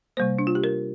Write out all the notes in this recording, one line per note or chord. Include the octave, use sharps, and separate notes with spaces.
C3 G3 A#3 C5
D4
F4
G4
A#4